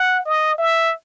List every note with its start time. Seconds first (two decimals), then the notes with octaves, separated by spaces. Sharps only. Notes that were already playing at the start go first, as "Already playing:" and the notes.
Already playing: F#5
0.25 D#5
0.58 E5